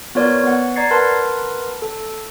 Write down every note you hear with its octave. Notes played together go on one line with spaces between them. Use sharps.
B3 F4 A#4 C#5 D5
B3 F#5
D5 A#5 G#6 A6 C7 C#7
A#4 B4 F#5 A5 B5 C6
A4